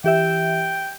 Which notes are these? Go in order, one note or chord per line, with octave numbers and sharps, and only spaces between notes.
E3 G4 E5 G5